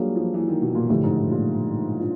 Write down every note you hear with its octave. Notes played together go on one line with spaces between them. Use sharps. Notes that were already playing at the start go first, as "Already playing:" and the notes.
Already playing: F#3 G3 A#3 D4 F4 G#4
F3
E3
D#3
B2
A#2
A2 D3 F3 A3 D4 G4
G#2
A2
A#2
D4 F4